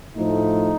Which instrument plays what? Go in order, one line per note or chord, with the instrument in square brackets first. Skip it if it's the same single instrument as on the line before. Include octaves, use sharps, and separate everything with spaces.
[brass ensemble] A2 F3 A3 D#4